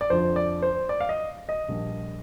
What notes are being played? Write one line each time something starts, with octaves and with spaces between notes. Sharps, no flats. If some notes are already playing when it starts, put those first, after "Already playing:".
D5
F2 D3 F3 C5
D5
C5
D5
F5
D#5
D#5
A#1 A#2 G3